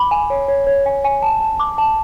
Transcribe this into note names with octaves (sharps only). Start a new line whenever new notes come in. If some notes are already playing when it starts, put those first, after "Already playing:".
Already playing: B5 D6
G#5
C#5
C#5
C#5
G#5
G#5
A5
A5
D6
A5